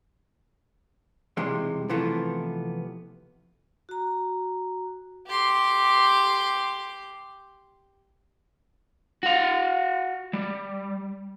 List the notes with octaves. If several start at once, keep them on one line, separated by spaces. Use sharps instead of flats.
B1 E2 C3 G3 G#3
C3 E3 F3 A3 B3
F#4 A#5
G4 C6
F#4 F5
G3